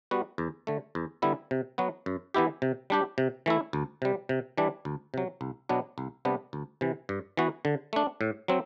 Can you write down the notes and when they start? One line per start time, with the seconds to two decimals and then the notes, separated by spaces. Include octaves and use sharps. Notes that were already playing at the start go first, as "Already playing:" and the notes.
0.11 G3 B3 F#4
0.38 E2
0.67 D3 A3
0.95 E2
1.22 D3 G3 B3 E4
1.51 C3
1.78 F#3 B3 F#4
2.06 F#2
2.34 E3 B3 E4 G4
2.62 C3
2.90 G3 D4 G4
3.18 C3
3.46 E3 A3 E4
3.73 D2
4.02 C3 G3
4.29 C3
4.58 E3 G3 D4
4.85 D2
5.14 C3 F#3
5.41 C2
5.69 B2 F#3 B3 D4
5.98 C2
6.25 C3 G3 B3 D4
6.53 D2
6.81 C3 E3
7.09 G2
7.37 E3 B3 F#4
7.65 D3
7.93 A3 D4
8.21 A2
8.48 F#3 C4